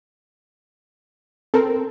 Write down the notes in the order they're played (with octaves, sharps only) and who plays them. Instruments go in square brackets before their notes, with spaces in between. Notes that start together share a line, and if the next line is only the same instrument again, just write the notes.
[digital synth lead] C4 [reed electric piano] A4 A#4